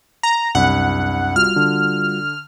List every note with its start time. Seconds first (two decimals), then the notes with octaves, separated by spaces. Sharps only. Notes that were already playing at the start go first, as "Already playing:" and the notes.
0.23 A#5
0.55 C2 F#2 D4 F#5 B5
1.36 G3 F4 F#4 F6
1.56 D3